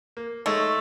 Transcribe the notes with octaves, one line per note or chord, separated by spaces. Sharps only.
A#3
G#3 A3 D#4 C#5